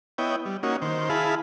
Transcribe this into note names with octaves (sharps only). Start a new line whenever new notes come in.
B3 E4 C#5 D#5 G5
G3
A#3 C#4 D#4 F#4
D#3 C5
E4 G#4 F5 A5 B5